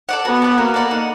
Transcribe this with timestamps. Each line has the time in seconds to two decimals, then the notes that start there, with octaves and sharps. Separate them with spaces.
0.09 A4 D5 F#5
0.25 B3 F#4
0.42 A4 D5 F#5
0.58 A#3 F#4
0.74 A4 D5 F#5
0.91 D#4